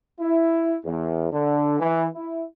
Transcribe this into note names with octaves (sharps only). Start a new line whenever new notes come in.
E4
E2
D3
E3
E4